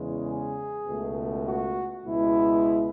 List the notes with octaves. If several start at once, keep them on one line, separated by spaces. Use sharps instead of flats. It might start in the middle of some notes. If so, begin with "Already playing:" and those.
Already playing: E2 C#3 G#3
G#4
C#2 B2 A3
F#4
C#2 B2 G#3 E4